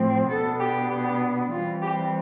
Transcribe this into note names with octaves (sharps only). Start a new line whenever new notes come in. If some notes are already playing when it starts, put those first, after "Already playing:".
Already playing: A2 F3 C4
B2 B3 D4 A4
G4
G4
E3 G3 C4 F4
G4